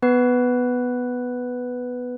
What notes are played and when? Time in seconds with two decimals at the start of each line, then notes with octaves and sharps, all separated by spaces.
0.02 B3 B4